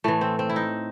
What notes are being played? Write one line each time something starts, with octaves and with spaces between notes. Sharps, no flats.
A2 E3 A3
C4
C4
E4
D#4